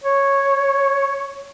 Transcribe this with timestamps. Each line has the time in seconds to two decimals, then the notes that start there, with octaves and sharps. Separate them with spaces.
0.04 C#5